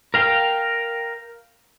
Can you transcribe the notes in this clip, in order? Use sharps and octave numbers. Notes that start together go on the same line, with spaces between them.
A#4 F5 G5